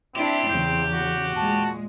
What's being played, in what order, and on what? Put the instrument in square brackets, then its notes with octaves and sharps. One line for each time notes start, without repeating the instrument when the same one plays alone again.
[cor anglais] C4 [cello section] D4 E4 [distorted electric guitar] G4
[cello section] E2 C#3 [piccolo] G6
[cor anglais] F#4
[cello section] A#2 G#3 [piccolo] A5